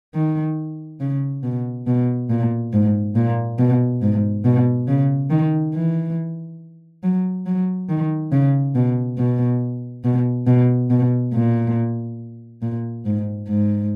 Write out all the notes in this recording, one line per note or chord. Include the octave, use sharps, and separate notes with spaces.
D#3
C#3
B2
B2
A#2
G#2
A#2
B2
G#2
B2
C#3
D#3
E3
F#3
F#3
D#3
C#3
B2
B2
B2
B2
B2
A#2
A#2
G#2
G#2